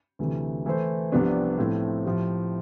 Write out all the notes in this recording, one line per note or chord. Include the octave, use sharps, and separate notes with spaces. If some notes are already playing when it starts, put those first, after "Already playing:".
D2 C3 E3 A3
E3 A3 E4 A4 C5
C2 C3 F3 B3 D4
A2 F3 A3 C4 E4
A2 F3 A3 E4 G4